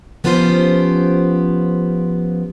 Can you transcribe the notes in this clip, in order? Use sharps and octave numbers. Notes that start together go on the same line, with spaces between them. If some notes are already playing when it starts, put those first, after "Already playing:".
F3 B3 C#4 F4 G4 C5